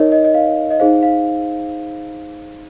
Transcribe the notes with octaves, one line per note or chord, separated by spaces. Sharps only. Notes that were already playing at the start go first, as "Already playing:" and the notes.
Already playing: D#4 A#4 C#5 D#5
D#5
D#5
F5
D#5
D#4 G#4 C5 F5
F5